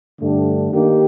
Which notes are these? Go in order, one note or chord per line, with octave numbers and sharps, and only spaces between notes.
G2 D3 A3 D4 G4
D#3 A#3 D#4 G4